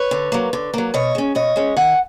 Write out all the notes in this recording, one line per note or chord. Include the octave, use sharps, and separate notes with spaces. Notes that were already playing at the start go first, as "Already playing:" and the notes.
Already playing: B4 C#5
D3
F#3 A#3
D3
F#3 A#3
B2 C#5 D#5
G#3 C#4
B2 C#5 D#5
G#3 C#4
D#3 F#5 G#5